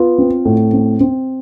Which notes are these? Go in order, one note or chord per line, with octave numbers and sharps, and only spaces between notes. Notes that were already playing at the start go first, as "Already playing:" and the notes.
Already playing: B3 F4
C4
A2
C4
C4